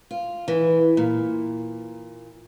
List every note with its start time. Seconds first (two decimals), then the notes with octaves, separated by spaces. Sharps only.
0.11 F4
0.48 E3
0.97 A#2